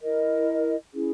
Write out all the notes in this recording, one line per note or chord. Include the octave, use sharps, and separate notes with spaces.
E4 A#4 D#5
C#4 E4 G#4